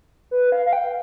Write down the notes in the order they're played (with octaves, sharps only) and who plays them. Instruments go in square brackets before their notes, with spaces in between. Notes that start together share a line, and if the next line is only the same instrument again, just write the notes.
[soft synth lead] B4
F5
F5
G5